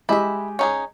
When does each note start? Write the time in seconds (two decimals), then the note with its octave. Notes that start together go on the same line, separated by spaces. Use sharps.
0.09 G#3 E4 G4 D#5 E5
0.59 C#4 D#4 G#4